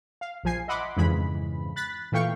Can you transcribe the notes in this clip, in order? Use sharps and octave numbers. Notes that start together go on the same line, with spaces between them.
F5
A#1 F3 G#5 C7
D#5 E5 F#5 B5 C6 D6
F2 G#2 C#3 E3 G#3 B5
B5 F#6 A6 B6
A#2 E3 A3 F5 G5 C#6